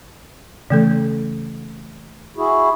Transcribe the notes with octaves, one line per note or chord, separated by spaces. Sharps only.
C#3 E3 A3 A4
E4 F#4 G#4